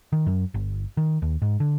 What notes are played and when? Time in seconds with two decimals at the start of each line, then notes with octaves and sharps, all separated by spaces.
0.13 D#3
0.27 F#2
0.54 G1
0.97 D#3
1.22 D#2
1.42 G#2
1.60 D3